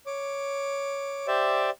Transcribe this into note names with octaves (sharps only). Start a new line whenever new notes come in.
C#5 D6
G4 C5 D5 E5